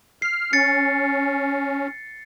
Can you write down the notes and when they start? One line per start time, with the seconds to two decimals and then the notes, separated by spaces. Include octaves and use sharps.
0.22 F6 C7
0.53 C#4 A6 C#7